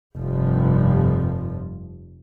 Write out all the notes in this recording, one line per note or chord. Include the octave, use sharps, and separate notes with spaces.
F1 G2 F3